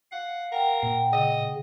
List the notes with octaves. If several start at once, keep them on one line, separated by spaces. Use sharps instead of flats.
F5 F#5
A#4 F#5 G5
A#2
C#3 D#5